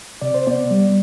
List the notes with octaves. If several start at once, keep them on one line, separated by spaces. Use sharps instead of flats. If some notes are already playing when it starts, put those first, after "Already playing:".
C3 D5
C5
B3 D5
G3